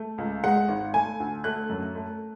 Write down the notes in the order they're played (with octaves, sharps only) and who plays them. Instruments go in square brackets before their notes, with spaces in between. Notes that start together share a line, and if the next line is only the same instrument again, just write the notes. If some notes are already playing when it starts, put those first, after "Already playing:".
Already playing: [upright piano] A3
C#2
G#3 F#5
G#1
A3 G#5
D2
A3 F#6
F#2
A3